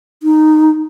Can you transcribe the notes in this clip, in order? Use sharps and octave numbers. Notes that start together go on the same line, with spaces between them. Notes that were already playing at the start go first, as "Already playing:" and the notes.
D#4